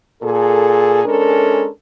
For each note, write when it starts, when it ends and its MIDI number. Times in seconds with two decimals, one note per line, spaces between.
0.22 1.03 46
0.22 1.03 68
0.22 1.03 69
1.05 1.67 56
1.05 1.67 61
1.05 1.67 62
1.05 1.67 69
1.05 1.67 70